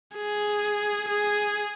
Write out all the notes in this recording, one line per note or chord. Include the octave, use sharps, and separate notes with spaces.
G#4
G#4